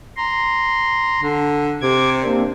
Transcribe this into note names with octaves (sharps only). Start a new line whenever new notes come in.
A#5 C6
D3
C3 D6 G#6
A#3 C4 D4